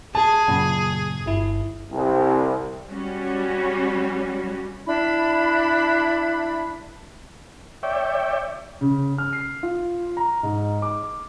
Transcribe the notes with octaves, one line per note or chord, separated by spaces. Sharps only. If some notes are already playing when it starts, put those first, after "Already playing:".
G#4 A5
F#2 A#2 C#3
G1 E4
C2
G3 C#4 F#4
D4 E4 B5
C#5 D5 E5 G5
C#3
F6
C7
F4
A#5
G#2
D6